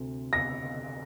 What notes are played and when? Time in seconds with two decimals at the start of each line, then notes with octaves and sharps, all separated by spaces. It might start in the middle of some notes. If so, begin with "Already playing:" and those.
Already playing: D2 C3
0.33 A#6